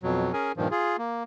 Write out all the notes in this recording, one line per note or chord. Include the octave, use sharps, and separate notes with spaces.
F2 B2 F#3
C#4 G#4 A#4 G#5
G2 A#2 D#3 F3
F4 G#4
A#3